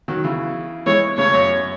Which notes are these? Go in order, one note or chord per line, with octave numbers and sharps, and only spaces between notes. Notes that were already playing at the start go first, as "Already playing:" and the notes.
D#3 F#3
C#3 E3
E3 G#3 C#5
A2 C#3 C#5
F#2